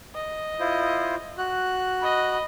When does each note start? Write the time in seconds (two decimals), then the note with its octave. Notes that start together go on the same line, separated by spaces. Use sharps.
0.15 D#5
0.60 E4 F4 C5
1.38 F#4 F#6
2.00 D#5 B5